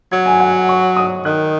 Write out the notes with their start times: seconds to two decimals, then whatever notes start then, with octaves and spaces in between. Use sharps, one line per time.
0.12 F#3 G#6
0.26 G#5
0.40 F#5
0.69 C#6
0.97 D#6
1.25 D#3 F#6